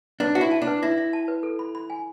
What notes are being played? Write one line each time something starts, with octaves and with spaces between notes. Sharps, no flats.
D4 B4
F#4 E5
E4
A5
D4
B4
E4 E5
E5
A5
B4
A4
B5
B5
G#5